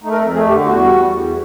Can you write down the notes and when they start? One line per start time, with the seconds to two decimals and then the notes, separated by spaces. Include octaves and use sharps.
0.03 A3 D#4
0.11 A#4
0.18 F2 A4
0.33 A3 G#4
0.48 D3 G4
0.63 E2 F#4
0.78 G3
0.93 E2
1.08 E2